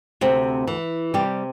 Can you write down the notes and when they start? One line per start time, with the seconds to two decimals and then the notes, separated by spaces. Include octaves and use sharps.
0.21 D2 C3 C4
0.67 E3
1.14 C3 G3 G4